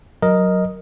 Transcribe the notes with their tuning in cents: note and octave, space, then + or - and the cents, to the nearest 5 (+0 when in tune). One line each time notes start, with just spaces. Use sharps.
F#3 +0 A#4 +5 D#5 +0